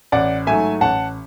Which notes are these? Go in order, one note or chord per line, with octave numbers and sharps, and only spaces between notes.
A1 D5 F#5
G#2 F#3 A3 E5 G#5
A1 F#5 A5